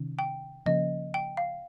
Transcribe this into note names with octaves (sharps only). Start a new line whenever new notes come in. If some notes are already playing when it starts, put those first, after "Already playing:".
Already playing: C3 D#3 C#4
G5
C#3 F3 A#3 C#4 D#5
G5
F5